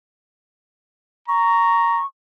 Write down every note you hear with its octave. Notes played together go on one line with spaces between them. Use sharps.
A#5 C#6